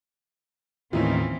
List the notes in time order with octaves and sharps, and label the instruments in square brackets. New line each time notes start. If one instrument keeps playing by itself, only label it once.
[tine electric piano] D#2 A2 [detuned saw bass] D#3 [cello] E3 C4 [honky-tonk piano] C#4 E4 F4